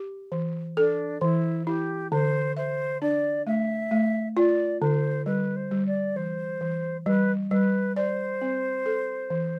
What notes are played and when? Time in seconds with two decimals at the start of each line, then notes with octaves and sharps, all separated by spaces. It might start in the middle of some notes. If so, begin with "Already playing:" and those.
Already playing: G4
0.32 E3
0.77 D4 A4
1.21 E3 E4
1.67 E4 G4
2.12 D3 C5
2.57 C5 E5
3.01 D4 D5
3.47 A3 E5
3.91 A3
4.37 F4 D5
4.81 D3 C5
5.26 G3 B4
5.56 C5
5.71 G3
5.86 D5
6.16 E3 C5
6.61 E3
7.06 G3 B4
7.51 G3 B4
7.96 C5 D5
8.42 C4
8.86 A4
9.30 E3